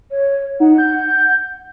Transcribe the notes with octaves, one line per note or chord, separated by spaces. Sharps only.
C#5
D#4 F#5
G6